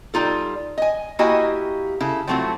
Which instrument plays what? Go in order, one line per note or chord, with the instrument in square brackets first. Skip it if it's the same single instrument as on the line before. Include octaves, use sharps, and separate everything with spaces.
[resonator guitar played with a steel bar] G3 D#4 F4 A4
D#5 G#5
A#3 E4 F#4 G4 D#5 G#5
C#3 E4 A4
F3 F#3 A3 C4 E4 F#4